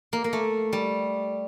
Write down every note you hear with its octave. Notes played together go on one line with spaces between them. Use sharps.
A#3
A#3
A3
G3